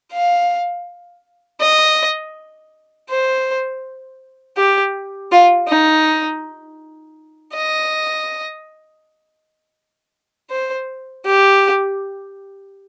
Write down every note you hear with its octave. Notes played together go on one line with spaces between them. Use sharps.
F5
D#5
C5
G4
F4
D#4
D#5
C5
G4